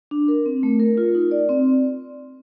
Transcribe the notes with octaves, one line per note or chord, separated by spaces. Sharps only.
D4
A#4
C4
A3
A#4
F4
D#4
D5
C4